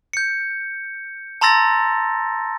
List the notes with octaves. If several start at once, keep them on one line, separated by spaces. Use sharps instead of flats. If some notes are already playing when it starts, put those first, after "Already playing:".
G6 C#7
A5 A#5 C6 E6 A6 A#6